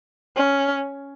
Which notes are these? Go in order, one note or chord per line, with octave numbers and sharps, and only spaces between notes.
C#4